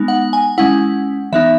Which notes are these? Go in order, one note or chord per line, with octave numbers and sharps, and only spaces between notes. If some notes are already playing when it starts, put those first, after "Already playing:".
Already playing: G#3 B3 D#4
F#5
G#5
G#3 C#4 E4 F#5
E3 B3 D#4 E5